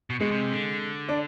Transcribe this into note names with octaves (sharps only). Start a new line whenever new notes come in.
B2
B2 G#3
C3
D3
D4